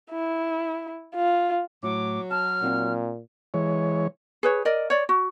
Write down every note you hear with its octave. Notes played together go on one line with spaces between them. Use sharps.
E4
F4
A2 F#3 E4 D6
A5 F6
A#2 C4 D#4
E3 G#3 C#5
G#4 B4 C#5
A#4 D5 D#5
C#5 D5
F#4